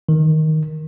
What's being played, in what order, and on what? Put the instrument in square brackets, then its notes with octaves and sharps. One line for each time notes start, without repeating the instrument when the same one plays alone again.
[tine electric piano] D#3